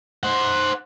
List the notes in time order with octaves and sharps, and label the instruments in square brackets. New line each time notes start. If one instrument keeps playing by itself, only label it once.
[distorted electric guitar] C5 F#5